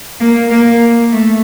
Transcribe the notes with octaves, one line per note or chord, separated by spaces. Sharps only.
A#3
A#3
A3